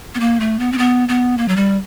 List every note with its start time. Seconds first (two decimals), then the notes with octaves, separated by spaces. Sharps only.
0.15 B3
0.20 A#3
0.40 A3
0.59 B3
0.72 C4
0.78 B3
1.09 B3
1.38 A#3
1.48 F#3
1.56 G3